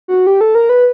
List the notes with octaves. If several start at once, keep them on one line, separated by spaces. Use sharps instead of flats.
F#4
G4
A4
A#4
B4